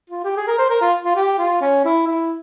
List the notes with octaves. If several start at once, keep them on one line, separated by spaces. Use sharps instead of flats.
F4
G4
G#4
A#4
C5
A#4
F4
F4
G4
F4
C#4
E4
E4